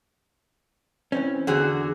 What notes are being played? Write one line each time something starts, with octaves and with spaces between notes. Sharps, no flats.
E3 C4 C#4
E2 D3 F#4 G#4